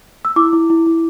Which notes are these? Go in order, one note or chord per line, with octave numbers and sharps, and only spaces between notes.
E6
E4 D6
E4
E4
E4